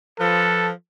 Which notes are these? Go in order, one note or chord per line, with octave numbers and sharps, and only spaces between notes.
F3 A4 B4